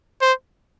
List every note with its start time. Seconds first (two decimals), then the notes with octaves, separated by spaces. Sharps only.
0.22 C5